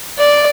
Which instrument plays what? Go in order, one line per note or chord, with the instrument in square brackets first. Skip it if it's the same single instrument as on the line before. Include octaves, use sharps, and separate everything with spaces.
[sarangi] D5